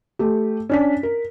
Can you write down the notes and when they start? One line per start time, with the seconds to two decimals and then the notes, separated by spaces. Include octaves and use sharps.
0.19 A3 G4
0.69 C#4 D4 B6
1.03 A#4